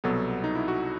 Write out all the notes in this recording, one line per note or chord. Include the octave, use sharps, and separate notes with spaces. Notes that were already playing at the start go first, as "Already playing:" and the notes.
C2 B2 F#3 B3 A4
D#4
E4
F#4